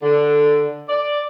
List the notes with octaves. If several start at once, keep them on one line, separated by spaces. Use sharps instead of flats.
D3
D5